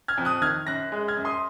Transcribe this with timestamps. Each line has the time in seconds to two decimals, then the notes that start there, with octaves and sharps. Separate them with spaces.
0.08 F6 G#6
0.18 F2
0.25 D#6 F#6
0.42 D#3 F6 G#6
0.67 F#2 F#6 A#6
0.92 G#3
1.08 F6 G#6
1.17 F#2
1.25 C6 D#6